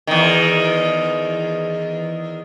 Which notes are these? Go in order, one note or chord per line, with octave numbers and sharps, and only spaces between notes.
E2 D#3